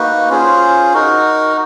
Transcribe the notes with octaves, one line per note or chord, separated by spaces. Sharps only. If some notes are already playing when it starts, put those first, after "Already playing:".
Already playing: A#3 D#4 F#4 B4
C#4 F4 G#4 C5
D#4 F#4 A#4